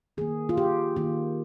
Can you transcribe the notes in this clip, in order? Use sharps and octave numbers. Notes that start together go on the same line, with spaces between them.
D#3 A#3 G#4
F4
G4
D#3 A#3 F4